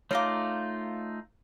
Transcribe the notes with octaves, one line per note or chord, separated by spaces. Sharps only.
A3 D#4 F4 A#4 C#5 F5 C6 D6